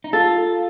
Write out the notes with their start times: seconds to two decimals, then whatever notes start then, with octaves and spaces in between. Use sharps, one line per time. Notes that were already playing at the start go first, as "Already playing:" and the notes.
0.04 D#4
0.13 F4 A4